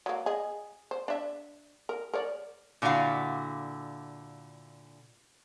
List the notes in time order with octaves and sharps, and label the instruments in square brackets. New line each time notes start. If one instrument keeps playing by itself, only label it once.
[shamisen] F#3 A#3
G#4 D#5
C5
D4 E5
A#4
A#4 C#5 D5
[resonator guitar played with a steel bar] A#2 D3 E4 F#4 F5 F#5